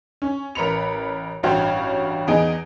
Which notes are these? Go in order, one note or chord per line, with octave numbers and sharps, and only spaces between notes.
C#4
A1 A#4 B4 B5 C#7 F7
A1 G2 F#4 C#5 F5 G5
E2 B3 D#4 G#4 D7